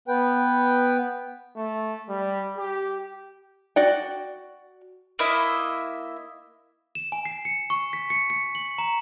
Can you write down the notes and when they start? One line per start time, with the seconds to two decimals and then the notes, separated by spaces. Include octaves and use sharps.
0.08 B3 B4 G5
1.57 A3
2.09 G3
2.58 G4
3.76 F#4 D5 F#5 G5
5.19 A#3 E4 D#5 E5
6.95 E7
7.12 G#5
7.25 C7
7.45 C#7
7.70 C#6
7.93 B6
8.10 C#7
8.30 C#7
8.55 F#7
8.78 A#5